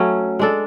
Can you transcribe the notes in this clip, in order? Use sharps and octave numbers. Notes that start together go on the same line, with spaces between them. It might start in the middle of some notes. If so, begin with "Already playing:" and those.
Already playing: F#3 A3 C#4
G#3 D4 A4